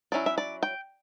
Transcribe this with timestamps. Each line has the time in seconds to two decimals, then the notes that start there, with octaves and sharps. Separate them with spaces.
0.12 F#3 C#4 E4 D5
0.26 E5
0.38 D5
0.63 G5